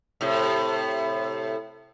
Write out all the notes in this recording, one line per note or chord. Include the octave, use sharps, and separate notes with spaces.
A2 C3